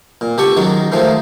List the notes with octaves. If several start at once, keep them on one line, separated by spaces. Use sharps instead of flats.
A#2
C#2 G4 A4 F#5 C#6
D#3 F#3 G#3 C#4
G#2 D#3 F3 G#3 A3